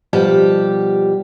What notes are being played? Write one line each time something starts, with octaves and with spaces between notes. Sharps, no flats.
B2 F3 G3 G4 A5